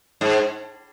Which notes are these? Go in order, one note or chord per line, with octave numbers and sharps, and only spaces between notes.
G#2